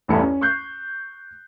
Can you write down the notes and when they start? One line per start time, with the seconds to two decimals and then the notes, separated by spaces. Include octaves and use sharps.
0.08 A1 E2 G2 E4 A4 C#7
0.20 C#4
0.41 C#6 E6 F#6 G6 C7